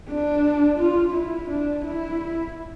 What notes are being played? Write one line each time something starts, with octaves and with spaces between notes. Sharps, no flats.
D4
F4
E4
D4
E4